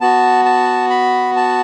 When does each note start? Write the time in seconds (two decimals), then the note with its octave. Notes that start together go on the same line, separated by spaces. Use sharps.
0.01 B3 F#4 A5
0.45 A5
0.90 B5
1.36 A5